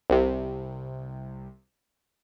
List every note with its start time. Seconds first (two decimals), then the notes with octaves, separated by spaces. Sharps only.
0.10 C2 C3